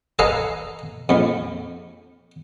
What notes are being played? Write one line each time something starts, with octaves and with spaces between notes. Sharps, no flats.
A4 B4 D#5 F5 G#5 A#5
A#1 F2